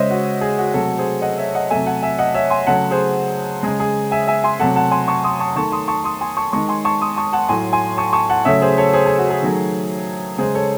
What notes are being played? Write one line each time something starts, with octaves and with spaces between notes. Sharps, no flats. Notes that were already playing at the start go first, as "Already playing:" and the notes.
Already playing: C#3 G#3 C5 C#5 D#5 E5
F#4
G#4
F#4
C3 F#3 A3 F#4 A4
G#4 C5
D#5 F#5
C#5 E5
D#5 F#5
C3 F#3 A3 E5 G#5
F#5 A5
E5 G#5
D#5 F#5
C#5 E5
G#5 C6
C#3 F#3 A3 F#5 A5
G#4 C5
C#3 G#3 G#4
G#4
E5 G#5
E5 G#5
G#5 C6
C3 F#3 A3 F#5 A5
F#5 A5
G#5 C6
A5 C#6
C6 D#6
A5 C#6
D#3 A3 A5 C#6
C6 D#6
A5 C#6
C6 D#6
G#5 C6
A5 C#6
D#3 G#3 A5 C#6
G#5 C6
A5 C#6
C6 D#6
A5 C#6
F#5 A5
A2 F#3 A3 G#5 C6
G#5 C6
A5 C#6
A5 C#6
F#5 A5
C#3 F#3 A3 C#5 E5
G#4 C5
A4 C#5
G#4 C5
G#4
F#4
G#4
D#3 F#3 A3
C#3 G#3 G#4 C5
A4 C#5